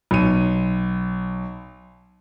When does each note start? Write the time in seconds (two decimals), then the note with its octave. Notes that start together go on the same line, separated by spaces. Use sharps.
0.11 B1 D#7